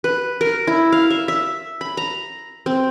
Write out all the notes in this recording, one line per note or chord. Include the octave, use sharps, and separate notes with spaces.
B4
A#4
E4
F5
E5
E5
B5
A#5
C4